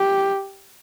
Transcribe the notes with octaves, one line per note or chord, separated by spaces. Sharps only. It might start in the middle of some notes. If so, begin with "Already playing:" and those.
Already playing: G4